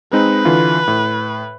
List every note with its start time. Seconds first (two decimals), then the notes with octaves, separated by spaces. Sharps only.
0.13 G#3 C4 D#4 B4
0.45 D3 E3 F4
0.88 A2